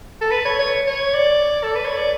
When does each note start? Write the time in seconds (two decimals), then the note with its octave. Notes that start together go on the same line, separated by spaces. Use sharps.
0.21 A4
0.31 B4
0.45 C#5
0.59 C#5
0.87 C#5
1.14 D5
1.63 A4
1.75 B4
1.85 C#5
1.97 D5